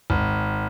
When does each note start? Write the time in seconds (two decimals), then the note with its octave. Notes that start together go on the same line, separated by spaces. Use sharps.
0.10 G#1